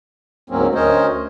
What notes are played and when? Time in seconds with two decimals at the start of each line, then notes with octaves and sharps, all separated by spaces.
0.50 D2 G#2 F#3 A#3 C4 C#4
0.75 D2 C#4 A#4 C5 C#5 D#5